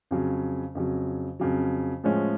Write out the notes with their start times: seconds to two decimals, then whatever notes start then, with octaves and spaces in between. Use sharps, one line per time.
0.11 F2 C#3 F#3
0.75 F2 C#3 F#3
1.40 F2 C#3 F#3
2.04 A2 F3 G#3 C#4